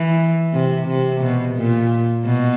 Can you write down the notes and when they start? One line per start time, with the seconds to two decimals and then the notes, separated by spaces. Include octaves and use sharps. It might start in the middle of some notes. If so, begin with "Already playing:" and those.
Already playing: E3
0.53 C3
0.87 C3
1.21 B2
1.56 A#2
2.25 B2